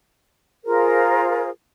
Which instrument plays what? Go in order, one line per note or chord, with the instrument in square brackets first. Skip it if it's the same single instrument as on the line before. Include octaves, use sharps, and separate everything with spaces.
[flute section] F4 G#4 A#4 C5